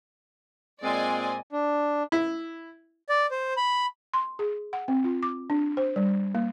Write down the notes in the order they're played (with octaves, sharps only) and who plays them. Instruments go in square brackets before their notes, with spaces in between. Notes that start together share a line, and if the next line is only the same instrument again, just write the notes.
[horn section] A#2 G#3 C4 [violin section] D5 D#5 G#5
[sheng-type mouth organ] D4
[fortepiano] E4
[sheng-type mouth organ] D5
C5
B5
[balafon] C6
G#4
F#5
C4
F4
D6
D4
C5
G3
A#3